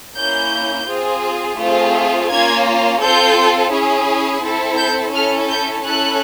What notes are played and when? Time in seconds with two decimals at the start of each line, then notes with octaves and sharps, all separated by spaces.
0.17 A#3 C#4 E4 G6
0.88 C4 F4 G#4
1.60 A3 C4 F4 G#4
2.30 A#3 C#4 F4 G#6
3.01 C4 F4 A4 G6
3.72 C#4 E4 G#4
4.43 C4 E4 A4
4.79 G6
5.14 C#4 E4 A4 F6
5.50 G6
5.85 C#4 E4 A4 F#6